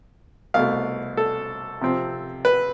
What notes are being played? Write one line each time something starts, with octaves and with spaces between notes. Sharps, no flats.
C2 B2 A3 F5
A4
C3 F3 C4
B4